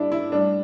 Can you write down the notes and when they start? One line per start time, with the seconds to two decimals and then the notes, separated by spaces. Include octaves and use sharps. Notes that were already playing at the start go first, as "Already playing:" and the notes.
Already playing: A#2 G3 D4 E4
0.12 E4
0.32 A2 G3 D4